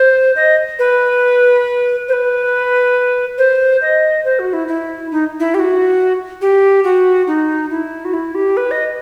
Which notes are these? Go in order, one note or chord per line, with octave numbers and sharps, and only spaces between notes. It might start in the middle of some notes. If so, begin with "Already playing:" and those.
Already playing: C5
D#5
B4
C5
B4
C5
D#5
C5
F#4
E4
E4
D#4
E4
G4
F#4
G4
F#4
D#4
E4
F#4
E4
G4
B4
D#5